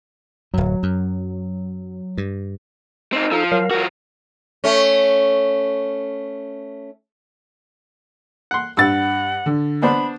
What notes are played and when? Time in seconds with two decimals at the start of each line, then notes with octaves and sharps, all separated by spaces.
0.54 D1 F#2 F#3
0.83 F#2
2.18 G2
3.13 C4 D#4
3.32 F3 D#4 A4
3.52 F#3 A#4 F5
3.71 F3 F#4 A#4
4.64 A3 C#4
8.51 F#5 C6
8.77 G2 F#5 E6 A6
9.46 D3
9.82 B3 D4 C5 B5